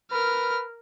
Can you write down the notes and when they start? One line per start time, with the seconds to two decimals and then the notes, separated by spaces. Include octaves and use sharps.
0.12 A#4 B4 F6